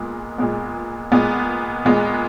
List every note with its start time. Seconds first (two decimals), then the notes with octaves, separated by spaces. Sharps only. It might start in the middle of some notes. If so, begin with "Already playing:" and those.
Already playing: A#2 G#3 B3
0.38 A#2 G#3 B3
1.12 A#2 G#3 B3
1.85 A#2 G#3 B3